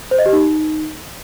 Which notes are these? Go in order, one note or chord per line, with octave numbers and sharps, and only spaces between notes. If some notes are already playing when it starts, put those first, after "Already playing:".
C5
D#5
G4
D#4